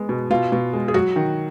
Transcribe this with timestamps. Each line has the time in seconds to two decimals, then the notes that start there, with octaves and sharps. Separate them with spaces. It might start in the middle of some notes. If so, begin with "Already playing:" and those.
Already playing: G#3 B3
0.09 B2
0.30 B2 F4
0.52 B2
0.73 G#3
0.88 G#4
0.94 F#3 F#4
1.16 D#3